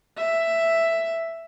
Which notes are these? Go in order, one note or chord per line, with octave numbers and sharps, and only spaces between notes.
E5